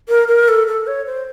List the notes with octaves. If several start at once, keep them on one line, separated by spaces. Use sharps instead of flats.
A#4
A#4
A4
A4
C#5
C5